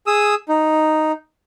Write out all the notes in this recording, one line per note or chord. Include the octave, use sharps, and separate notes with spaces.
G#4 D#6 E6
D#4